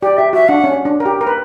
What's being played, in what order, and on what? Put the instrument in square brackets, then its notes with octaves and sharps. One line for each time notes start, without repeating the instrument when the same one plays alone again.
[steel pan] G4 [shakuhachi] D5
[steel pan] G4 [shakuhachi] E5
[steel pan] F#4 [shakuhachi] E5
[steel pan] D4 [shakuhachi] F#5
[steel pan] C#4
D4
A#4
G4
A#4
B4